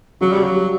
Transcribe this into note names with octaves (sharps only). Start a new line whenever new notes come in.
C#3 F#3
G3
C#3
F#3
G3